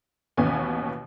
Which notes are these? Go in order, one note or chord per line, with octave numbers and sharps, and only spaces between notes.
A1 D#2 B2 B3 C#4 G#5